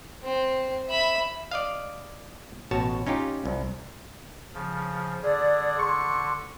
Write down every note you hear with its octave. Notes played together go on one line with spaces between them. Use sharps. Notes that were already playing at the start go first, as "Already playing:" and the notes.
C4
E5 B5
D5 D#5 F5
A1 B2 F#4 C#5 A5
C#4 D#4 F4 G4
C2
C#3 F3
D3 G#4 D5
C6 C#6